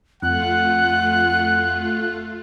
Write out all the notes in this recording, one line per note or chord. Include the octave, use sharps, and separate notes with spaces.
F2 A3 F4 F#5 F#6